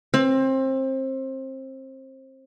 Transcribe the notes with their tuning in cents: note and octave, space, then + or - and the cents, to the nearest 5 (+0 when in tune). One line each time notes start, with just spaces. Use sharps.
C4 +25